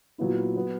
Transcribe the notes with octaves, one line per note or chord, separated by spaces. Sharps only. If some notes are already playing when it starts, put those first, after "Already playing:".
A#2 F#3 B3 E4
F#3 B3